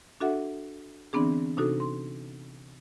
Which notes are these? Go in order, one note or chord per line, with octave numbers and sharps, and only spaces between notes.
D4 F#4 A4 E5 F#5
D3 E3 B3 C4 D4 G#4
C3 D4 D#4 F#4 A4
C6